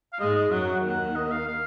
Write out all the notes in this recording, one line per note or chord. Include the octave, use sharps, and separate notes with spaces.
F5
G#2 G#3 D#5
D#5
F#2 F#3 F#5
F#5
D#2 D#3 F#5
D#5
F5
F5